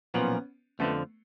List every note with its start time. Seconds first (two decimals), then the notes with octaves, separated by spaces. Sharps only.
0.14 B1 A#2 F3 B3 C#4
0.79 F2 D3 F3 A3 B3